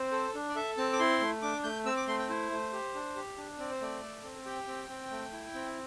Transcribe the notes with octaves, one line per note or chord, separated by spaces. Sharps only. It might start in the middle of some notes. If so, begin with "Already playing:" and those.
Already playing: C4 C5
A4
D4
D5
A4 E5
C4 A5
D6
E4 C6
A3
D4 D6
A3 G6
C4 E6
D6
A3 C6
G5
E4 C5
A3
G4
D4
G4
D4
C4 D5
C5
A3 D5
A4
C4
G4 G5
C4
C4
A3
E4
C4